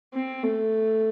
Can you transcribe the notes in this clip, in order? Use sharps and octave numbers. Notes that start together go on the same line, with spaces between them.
C4
A3